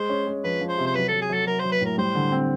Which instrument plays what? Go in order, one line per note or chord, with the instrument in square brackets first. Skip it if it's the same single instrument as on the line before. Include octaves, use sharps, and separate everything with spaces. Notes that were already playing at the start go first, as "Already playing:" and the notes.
Already playing: [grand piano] G#3 [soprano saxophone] C5
[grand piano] C#4
G#3
[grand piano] F3 [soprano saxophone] B4
[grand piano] F3
[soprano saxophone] C5
[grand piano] C3
[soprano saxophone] C5
[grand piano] F#3 [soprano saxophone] B4
[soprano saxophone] A4
[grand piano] F#3
[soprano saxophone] G#4
[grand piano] F#3 [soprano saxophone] A4
[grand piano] F#3 [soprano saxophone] A#4
[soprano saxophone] C5
[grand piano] F#3
[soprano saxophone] B4
[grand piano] A2 [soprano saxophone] A#4
[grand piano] G3 [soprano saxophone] C5
[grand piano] D3
C4